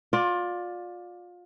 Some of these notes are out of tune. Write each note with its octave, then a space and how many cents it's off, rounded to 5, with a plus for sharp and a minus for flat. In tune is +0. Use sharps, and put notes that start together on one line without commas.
F4 +25 D5 +0